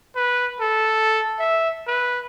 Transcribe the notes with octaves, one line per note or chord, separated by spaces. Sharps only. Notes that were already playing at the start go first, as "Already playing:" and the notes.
B4
A4
E5
B4